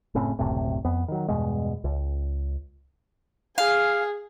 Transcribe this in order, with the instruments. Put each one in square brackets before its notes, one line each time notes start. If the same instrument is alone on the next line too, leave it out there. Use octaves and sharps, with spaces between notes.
[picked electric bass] F#1 A2 C#3 C4
F#1 D2 A2 C3
F2 B3
D#3 F#3
E2 G2 B2 G#3
C#2
[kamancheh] G#4 [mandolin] F5